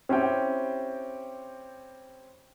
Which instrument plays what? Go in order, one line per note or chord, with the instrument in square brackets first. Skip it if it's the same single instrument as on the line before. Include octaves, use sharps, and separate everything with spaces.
[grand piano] C4 C#4 E4 G4 G5